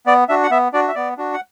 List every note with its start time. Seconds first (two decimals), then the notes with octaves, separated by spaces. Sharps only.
0.06 B3 D5
0.28 D4 F#4 E5
0.43 F#5
0.51 B3 E5
0.73 D4 F#4 D5
0.88 E5
0.95 B3 D5
1.18 D4 F#4
1.34 F#5